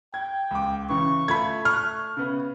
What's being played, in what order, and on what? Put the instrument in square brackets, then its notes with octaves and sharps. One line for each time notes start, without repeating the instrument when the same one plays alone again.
[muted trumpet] G5 [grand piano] G#6
[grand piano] C#2 D6
[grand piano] C#3 E3 [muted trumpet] C#6
[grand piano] A3 F4 [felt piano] B5 G#6
[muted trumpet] A3 [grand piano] C#6 F#6 [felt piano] F6
[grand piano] C#3 B3